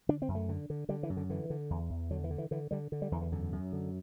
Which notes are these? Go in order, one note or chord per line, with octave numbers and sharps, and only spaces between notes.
D3 D4
C4
F#2
A3
D3
D3
D3 G3
E3
F#2
D3
D3 E3
D3
E2
E2
D3 F#3
E3
D3
E3
D3 E3
D3 G3
D3
G3
E2 E3
E3
F#2 D3
F#2
D3